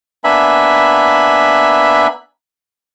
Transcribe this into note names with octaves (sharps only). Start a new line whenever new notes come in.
A#3 B3 D4 E5 G#5 B5